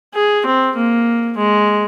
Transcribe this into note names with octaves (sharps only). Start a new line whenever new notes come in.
G#4
C4
A#3
G#3